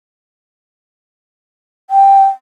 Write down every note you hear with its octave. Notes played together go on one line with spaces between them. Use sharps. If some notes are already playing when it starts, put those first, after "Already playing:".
G5